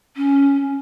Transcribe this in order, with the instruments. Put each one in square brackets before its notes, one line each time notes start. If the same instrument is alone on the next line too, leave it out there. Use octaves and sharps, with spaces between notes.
[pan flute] C#4